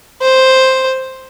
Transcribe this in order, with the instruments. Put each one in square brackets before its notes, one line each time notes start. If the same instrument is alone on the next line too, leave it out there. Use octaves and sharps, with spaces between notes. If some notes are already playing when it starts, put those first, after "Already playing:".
[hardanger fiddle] C5